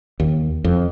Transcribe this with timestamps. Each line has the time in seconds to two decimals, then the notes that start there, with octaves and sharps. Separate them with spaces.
0.20 D#2
0.64 F2